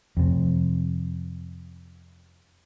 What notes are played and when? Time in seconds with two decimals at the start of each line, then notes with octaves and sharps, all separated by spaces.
0.17 F2 C3